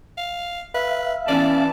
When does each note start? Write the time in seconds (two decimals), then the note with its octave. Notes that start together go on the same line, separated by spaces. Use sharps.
0.17 F5
0.74 B4 E5 F5
1.28 E3 B3 C#4 D5 A5